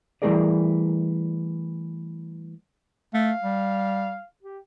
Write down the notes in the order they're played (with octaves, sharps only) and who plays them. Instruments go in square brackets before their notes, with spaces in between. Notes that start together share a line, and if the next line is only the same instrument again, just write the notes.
[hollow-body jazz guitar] E3 G3 A3 G#4 A#4 D5
[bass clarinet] A3 [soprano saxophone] F5
[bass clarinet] G3
[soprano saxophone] G4